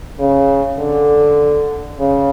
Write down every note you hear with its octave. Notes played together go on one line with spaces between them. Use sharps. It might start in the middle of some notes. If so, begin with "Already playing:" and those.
C#3
D3
C#3